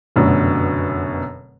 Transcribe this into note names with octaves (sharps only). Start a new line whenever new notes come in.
F1 F#2 B2 D3